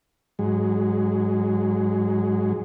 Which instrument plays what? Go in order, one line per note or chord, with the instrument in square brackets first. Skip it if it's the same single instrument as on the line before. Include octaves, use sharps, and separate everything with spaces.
[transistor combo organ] G#2 F#3 G#3